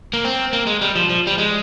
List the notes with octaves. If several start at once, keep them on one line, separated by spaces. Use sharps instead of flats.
A#3
C4
A#3
G#3
G3
F3
F3
G3
G#3